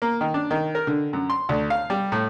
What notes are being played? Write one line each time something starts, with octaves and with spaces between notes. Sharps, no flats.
A#3
D#3
D4
D#3
A#4
D3
F#2
C6
D2
F5
G3
A2